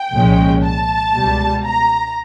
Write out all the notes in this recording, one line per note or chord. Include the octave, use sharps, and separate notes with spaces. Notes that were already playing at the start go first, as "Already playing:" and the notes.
Already playing: G5
C2 A#2 F3 G#3 C#4
A5
C#2 B2 G3
A#5